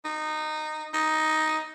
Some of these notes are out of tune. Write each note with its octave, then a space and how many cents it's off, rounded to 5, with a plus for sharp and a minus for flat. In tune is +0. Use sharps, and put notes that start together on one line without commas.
D#4 -15
D#4 +5